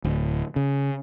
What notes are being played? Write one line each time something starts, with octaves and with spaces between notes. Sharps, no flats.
D1
C#3